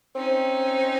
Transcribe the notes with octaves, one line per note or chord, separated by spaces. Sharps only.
C4 C#4 D#4